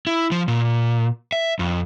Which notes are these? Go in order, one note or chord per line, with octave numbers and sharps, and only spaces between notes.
E4
F3
A#2
E5
F2